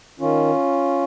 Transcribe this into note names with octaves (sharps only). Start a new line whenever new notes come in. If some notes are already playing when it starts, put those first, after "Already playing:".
D#3 C#4 F4